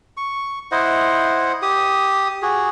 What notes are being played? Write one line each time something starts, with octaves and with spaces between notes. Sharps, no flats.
C#6
E4 C5 D#5 F#5
G4 D#6
F#4 G#4